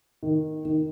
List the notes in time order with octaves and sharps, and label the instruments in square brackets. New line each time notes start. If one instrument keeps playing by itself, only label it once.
[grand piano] D#3
D#3